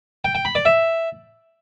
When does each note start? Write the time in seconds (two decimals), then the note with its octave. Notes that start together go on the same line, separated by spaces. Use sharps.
0.24 G5
0.35 G5
0.45 B5
0.55 D5
0.65 E5